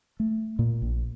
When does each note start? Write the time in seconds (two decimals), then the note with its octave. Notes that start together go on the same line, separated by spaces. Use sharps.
0.20 A3
0.59 A#2
0.82 A#1